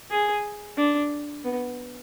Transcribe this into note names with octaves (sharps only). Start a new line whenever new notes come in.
G#4
D4
B3